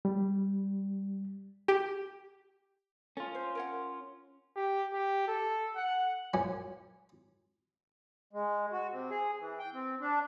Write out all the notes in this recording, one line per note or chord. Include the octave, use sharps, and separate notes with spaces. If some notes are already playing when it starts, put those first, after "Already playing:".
G3
G4
C#4 F4 A4
C5
A#4 C#5 F#5
G4
G4
A4
F#5
F#2 F3 C#4 G#5
G#3
F#4
C3
G#4
E3
G5
C4
D4